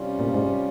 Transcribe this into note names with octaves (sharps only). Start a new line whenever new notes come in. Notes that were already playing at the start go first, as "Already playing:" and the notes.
Already playing: C3 G3 C#4 F4
A#2
G#2